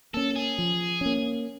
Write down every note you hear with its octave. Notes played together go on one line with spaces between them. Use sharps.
A#3 C#4 A4
G#4
F3
A#3 C#4